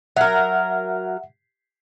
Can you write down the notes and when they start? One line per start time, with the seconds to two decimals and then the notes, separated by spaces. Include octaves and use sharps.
0.17 F#3 A#4 E5 F#5